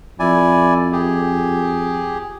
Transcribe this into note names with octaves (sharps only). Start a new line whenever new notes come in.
F2 E4 D5 G#5
G4 G#4